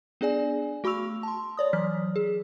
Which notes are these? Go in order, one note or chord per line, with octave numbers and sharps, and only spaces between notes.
B3 D4 G#4 D5 G#5
A3 F#4 B5 C#6 E6 F7
A5 C6
C#5 D5 D#6
E3 F#3 F6 B6
G#4